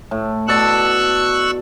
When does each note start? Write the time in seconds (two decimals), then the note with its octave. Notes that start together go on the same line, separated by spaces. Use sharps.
0.11 A2
0.48 B2 A4 D5 C#6 E6 F#6